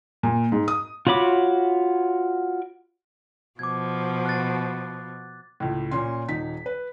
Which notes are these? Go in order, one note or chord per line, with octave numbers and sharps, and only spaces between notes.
A#2
G#2
D#6
F4 F#4 C#5 B5 D6
B2 F3 D6 G#6
F#6 A6
C#2 A2
A#2 C#4 C6
D#1 D#4 B6
B4